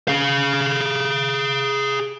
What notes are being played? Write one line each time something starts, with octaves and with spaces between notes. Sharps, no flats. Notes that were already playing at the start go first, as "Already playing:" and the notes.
G#4 F5